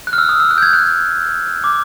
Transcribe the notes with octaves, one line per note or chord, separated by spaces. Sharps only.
F#6
F6
E6
D#6
E6
F#6
G6
G#6
F#6
D6